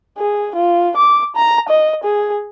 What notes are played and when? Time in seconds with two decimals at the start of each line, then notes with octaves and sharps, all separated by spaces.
0.18 G#4
0.55 F4
0.97 D6
1.36 A#5
1.69 D#5
2.03 G#4